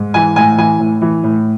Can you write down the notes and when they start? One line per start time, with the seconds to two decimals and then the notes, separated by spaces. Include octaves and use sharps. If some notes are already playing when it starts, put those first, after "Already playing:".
Already playing: G#2
0.14 E3 G#5
0.36 A2 G#5
0.58 E3 G#5
0.80 A2
1.02 E3
1.24 A2